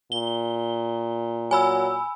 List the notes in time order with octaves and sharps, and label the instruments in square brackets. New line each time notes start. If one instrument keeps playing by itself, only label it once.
[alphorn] A#2 [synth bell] G7
[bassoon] F#3 [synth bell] G#5 B5 E6